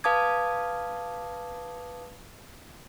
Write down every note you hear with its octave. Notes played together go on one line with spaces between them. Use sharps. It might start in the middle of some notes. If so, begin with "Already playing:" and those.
B4 F5 A5 D6 D#6 G#6